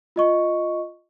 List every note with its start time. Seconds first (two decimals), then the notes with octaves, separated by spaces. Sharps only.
0.16 F4 D#5 C#6